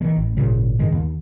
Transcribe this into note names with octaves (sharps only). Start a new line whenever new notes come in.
D#3 E3 G#3
A1
G#1 A#2 C#3 G3
G2 D3 D#3 G#3
D#2